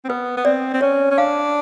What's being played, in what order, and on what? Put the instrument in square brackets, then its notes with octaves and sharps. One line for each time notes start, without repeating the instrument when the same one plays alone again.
[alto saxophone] C4
[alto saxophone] B3 [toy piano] B4
[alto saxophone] B3
[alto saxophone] C4 [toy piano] D5
[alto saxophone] C4
[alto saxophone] C#4 [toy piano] C#5
[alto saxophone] C#4
[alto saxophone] D4 [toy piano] F5